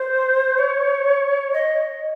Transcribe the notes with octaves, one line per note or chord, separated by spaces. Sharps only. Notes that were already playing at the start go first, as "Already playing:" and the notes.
Already playing: C5
C#5
D#5